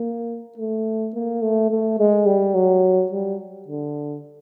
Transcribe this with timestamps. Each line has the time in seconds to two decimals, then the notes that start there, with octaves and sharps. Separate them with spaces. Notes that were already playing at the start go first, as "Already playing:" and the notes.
Already playing: A#3
0.58 A3
1.14 A#3
1.42 A3
1.71 A3
1.99 G#3
2.26 G3
2.55 F#3
3.12 G3
3.68 D3